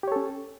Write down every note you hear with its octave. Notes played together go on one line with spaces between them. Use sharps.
C#4 G4 A4 C#5